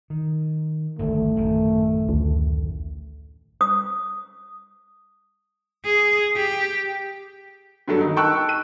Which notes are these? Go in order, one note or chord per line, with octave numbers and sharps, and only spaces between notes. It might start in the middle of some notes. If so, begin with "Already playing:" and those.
D#3
G#1 D2 G2 A3
A1 F#2 D#3
D2
D#6
G#4
G4
G2 F#3 A4
D#3 D#4
G5 A5 C#6 E6 F#6
D#7